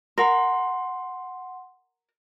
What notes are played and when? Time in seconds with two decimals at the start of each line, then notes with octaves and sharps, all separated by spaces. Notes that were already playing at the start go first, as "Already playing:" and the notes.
0.18 A#4 F#5 C6